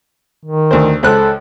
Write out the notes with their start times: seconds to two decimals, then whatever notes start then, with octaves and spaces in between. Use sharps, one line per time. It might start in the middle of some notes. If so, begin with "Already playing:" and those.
0.45 D#3
0.71 D2 C5
1.03 C#2 A4 C5 F#6